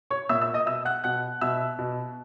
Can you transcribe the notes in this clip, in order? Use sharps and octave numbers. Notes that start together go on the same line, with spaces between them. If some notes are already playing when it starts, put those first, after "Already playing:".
C#5 C#6
A#2 E5 E6
E5 E6
D#5 D#6
B2 E5 E6
F#5 F#6
B2 F#5 F#6
B2 E5 E6
B2